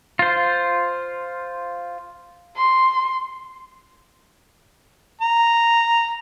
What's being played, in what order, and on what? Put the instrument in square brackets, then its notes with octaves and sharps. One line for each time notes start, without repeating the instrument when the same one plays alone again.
[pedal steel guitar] F4 C5
[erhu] C6
[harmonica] A#5